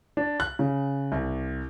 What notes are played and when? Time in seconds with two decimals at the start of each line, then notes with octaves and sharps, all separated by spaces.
0.17 D4
0.40 F#6
0.59 C#3
1.12 C2